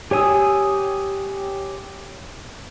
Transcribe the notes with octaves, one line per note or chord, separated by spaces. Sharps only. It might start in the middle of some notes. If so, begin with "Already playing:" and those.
G4 C#5 G#5 D#6 E6